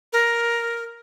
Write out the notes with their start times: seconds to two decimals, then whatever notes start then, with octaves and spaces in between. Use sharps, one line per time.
0.13 A#4